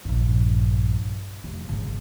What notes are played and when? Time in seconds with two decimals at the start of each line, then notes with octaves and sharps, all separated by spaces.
0.05 A#1 G2
1.44 F1
1.68 G#1 C#3